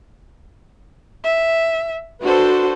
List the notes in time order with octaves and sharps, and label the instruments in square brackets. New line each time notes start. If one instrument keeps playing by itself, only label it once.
[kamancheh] E5
[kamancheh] D4 A4 [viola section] F#4 B4 C5